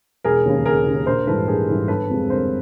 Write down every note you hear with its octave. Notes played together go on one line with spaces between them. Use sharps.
E1 G#4 A#4
D#2 C#3
E1 G#4 A#4
D#2 C#3
A#1 A#4 C5
G#2 E3 G3 A4 B4
A#1 G#4 A#4
G#2 E3 G3
G1 A4 B4
F2 C3 F3 G#3
G1 A#4 C5